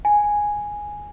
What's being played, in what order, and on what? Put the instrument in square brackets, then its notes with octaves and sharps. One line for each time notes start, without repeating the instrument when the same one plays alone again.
[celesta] G#5